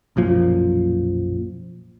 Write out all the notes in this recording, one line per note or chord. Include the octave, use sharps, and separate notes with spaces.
B1 F#2 A#2 F3